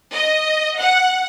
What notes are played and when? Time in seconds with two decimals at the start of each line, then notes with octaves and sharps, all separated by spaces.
0.13 D#5
0.79 F#5